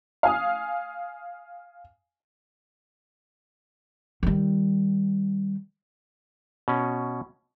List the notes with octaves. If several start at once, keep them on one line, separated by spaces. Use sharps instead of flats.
F5 G#5 D#6
D#3 G3
B2 C#4